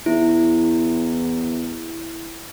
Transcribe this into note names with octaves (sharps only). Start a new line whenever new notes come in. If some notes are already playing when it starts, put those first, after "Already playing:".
E2 E4